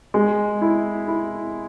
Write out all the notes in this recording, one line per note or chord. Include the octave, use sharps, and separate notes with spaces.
G#3
E4
E4